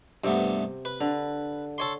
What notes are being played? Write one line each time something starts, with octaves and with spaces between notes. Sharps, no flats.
G2 C3 A3 B3
B4
D3
A4 C#5 C6